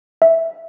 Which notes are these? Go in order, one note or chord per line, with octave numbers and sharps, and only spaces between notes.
E5